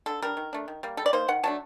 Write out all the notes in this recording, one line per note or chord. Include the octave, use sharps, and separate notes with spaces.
D3 A4
G3 D4 A#4
D#3
A3 D4
D#3
G3 A#3
G3 A4
D5
A#3 D#4 C5
D#3 F#5
F#3 A3 D4 A5